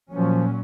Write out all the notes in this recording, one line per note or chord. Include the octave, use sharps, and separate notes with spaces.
A#2 F3 F#3 C#4